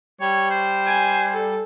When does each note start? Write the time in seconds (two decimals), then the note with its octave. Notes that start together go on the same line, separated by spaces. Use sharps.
0.21 G3 C#5
0.51 C5
0.86 G#5
1.33 A4